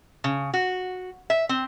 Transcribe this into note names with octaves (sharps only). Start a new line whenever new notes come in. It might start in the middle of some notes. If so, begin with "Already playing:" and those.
C#3
F#4
E5
C4